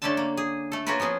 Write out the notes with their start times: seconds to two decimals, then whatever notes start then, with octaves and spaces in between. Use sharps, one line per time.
0.02 D3 A3 C#4 D4 E5 A5
0.17 A#3
0.37 G#4
0.72 A3 A4
0.87 A#3 C#4 F4 F#4 A#4 B4
1.00 F3 B3 C#4 G#4